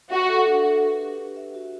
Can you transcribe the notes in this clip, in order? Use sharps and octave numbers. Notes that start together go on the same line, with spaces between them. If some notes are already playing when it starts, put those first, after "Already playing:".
F#4 E5
A4
D4
D4
B4
G4
D4
E5
F#4